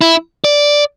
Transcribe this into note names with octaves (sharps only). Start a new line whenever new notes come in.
E4
D5